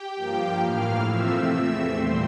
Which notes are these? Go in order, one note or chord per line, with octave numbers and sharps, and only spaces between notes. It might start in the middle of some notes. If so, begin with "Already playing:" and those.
Already playing: G4 G5
G2 F3 A#3
A2 E3 A#3 F5 F6
C3 F3 A3 C4 E5 E6
E2 E3 A3 C4
A#2 G3 C4 C5 C6